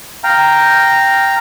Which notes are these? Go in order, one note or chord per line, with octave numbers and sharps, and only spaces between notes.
F5 G5 A#5